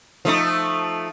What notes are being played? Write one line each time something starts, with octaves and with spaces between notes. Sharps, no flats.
F3 A3 D#4